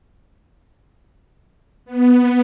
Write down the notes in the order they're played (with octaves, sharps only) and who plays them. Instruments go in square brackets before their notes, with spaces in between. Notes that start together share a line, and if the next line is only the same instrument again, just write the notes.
[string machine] B3